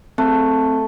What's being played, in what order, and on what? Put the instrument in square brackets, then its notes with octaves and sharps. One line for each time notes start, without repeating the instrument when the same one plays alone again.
[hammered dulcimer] A3 [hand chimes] C4